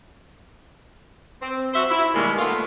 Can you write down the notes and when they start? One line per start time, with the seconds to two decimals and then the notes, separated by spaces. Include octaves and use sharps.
1.41 C4
1.74 F#3 F#4 C5 E5
1.91 E4
2.14 B2 D#3 G3 G#3 A#3
2.38 A3 B3 F4